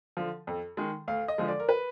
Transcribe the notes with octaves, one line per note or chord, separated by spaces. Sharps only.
D3 F3
F2
D#3 G#3
D2 F5
D#5
D3 F3 G#3
D5
A#4
B4